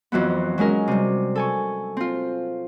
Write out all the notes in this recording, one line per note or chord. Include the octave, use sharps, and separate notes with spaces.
F2 E3 F#3 B3
F#3 G#3 C#4 A#4
C3 G3
A4 G#5 C#6
C4 F4